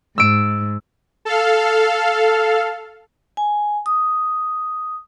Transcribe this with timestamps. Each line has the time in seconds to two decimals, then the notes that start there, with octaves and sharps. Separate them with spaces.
0.18 G#2 E6 D7
1.25 A4 F5
3.37 G#5
3.86 D#6